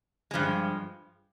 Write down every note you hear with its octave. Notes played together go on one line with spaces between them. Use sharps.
G2 F3 G#3